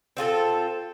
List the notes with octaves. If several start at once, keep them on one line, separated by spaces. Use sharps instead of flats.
C4 F4 G#4 A4